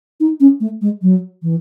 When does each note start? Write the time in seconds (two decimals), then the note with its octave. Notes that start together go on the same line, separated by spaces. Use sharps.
0.20 D#4
0.40 C#4
0.60 A3
0.82 G#3
1.02 F#3
1.43 E3